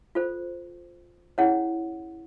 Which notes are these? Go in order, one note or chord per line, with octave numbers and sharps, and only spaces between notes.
F4 A4 C5
C#4 E4 G#4 C#5 F#5